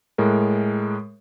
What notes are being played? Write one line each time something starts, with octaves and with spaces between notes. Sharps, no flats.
A2 G#3 A#4